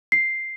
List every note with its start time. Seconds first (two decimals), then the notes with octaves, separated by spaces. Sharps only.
0.12 C7